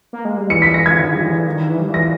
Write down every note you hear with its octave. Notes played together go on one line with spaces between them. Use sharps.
A#3
G#3
G3
E3 C#7
B6
A#6
G#6
D#3
G3
E3
D#3
E3
G3
E3 A#6